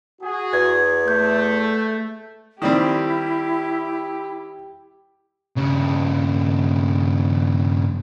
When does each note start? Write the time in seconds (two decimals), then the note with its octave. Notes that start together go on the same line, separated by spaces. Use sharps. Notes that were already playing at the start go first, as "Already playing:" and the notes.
0.22 F#4 G#4
0.53 E2 G#6
1.08 A3 G6
2.62 D#3 G3 C4 E4 G4
5.57 G2 C#3